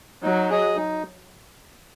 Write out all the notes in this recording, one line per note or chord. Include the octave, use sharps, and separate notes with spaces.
F#3 D#4
G#4 D#5
D#4